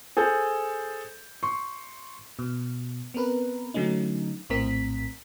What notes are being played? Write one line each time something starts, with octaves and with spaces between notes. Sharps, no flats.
G#4 A4 C5 G6
C6 C#6
B2
B3 C4 A#4 B4
D3 F#3 A3 C#4 D#4
A#1 A2 C4 A#4 B6